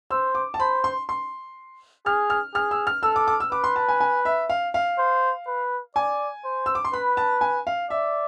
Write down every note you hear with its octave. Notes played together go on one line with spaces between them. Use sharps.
C5 E6
D6
A5
C5 B5
C6
C6
G#4 F6
F6
G#4 F6
E6
F6
A4 E6
D6
D6
E6
B4 D6
C6
A5
G#5
G#5
E5
F5
F5
C5
B4
D5 G#5
C5
E6
D6
C6
B4 B5
A5
G#5
F5
D5 E5